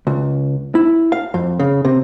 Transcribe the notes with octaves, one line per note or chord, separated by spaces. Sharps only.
C#2
E4
F5
F2
C#3
C3